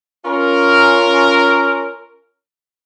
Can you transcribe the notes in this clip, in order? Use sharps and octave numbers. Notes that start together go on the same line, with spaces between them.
C#4 F4 A#4